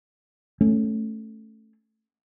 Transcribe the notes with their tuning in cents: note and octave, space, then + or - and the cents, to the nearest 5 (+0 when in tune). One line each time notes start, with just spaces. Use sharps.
A3 +0 C#4 +0